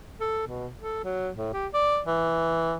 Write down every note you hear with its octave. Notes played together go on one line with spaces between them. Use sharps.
A4
B2
A4
F#3
A2
G4
D5
E3